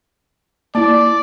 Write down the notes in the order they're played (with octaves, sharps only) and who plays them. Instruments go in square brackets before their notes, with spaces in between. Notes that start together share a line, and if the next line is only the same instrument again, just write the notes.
[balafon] A#3 E4 [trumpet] D5